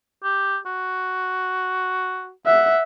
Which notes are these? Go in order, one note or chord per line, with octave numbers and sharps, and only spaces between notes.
G4
F#4
E5 F#5